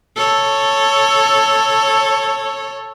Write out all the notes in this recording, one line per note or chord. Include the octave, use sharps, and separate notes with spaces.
A4 C#5